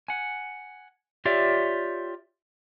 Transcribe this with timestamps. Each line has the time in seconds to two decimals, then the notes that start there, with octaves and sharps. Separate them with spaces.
0.08 F#5 G#5
1.25 F4 G4 C#5 D5 E5